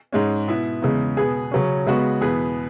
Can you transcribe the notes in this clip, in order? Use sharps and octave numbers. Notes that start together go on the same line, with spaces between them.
G#2 G#3 C#4
B2 B3 E4
E2 C#3 G#3
B2 B3 G#4
C#3 F#3 C#4
C#3 G#3 B3 F#4
E2 B2 B3 G#4 B4